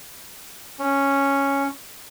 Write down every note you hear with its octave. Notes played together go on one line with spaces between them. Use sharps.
C#4